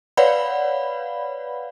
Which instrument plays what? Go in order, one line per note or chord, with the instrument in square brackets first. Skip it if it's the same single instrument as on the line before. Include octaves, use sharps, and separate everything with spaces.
[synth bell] B4 C#5 D5 F5 F#5 B5